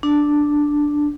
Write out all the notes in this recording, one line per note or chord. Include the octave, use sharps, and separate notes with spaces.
D4